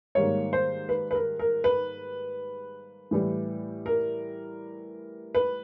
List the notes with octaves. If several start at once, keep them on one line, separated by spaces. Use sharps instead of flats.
G#2 D#3 G3 A#3 C#5
C5
B4
B4
A#4
A#4
B4
A2 E3 G3
A#4
B4